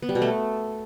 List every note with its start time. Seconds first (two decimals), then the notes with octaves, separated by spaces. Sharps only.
0.02 B3
0.09 G3
0.15 B2
0.22 A3